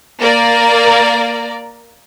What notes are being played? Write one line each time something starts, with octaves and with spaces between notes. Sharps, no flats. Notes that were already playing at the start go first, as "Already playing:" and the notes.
A#3 A#4 D5 A#5